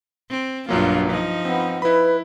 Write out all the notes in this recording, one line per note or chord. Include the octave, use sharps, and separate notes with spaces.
C4
B1 G2 F#3 A#3 F4
F3 D#4
B3 C4
E4 B4 B5